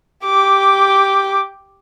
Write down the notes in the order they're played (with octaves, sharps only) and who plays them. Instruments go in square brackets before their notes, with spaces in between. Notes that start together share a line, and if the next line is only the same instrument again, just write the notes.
[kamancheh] G4 D6